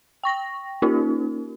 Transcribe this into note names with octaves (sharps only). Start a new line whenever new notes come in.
G5 C#6 A#6
A#3 C#4 D#4 F4 G4 A#4